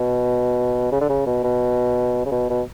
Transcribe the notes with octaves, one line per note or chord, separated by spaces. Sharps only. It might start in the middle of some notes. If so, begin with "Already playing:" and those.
Already playing: B2
C#3
D3
C#3
B2
B2
C#3
B2
B2